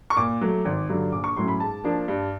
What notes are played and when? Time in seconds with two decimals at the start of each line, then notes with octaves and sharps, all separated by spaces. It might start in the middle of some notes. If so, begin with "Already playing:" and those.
0.10 C#6
0.17 A#2 D6
0.41 F#3 A3
0.65 G#1
0.89 G2 D3 F#3
1.12 A#1 D6
1.24 C#6
1.36 A2 F#3 A3 C#4 C6
1.48 B5
1.60 G#2 A5
1.84 F3 A#3 D4
2.08 G2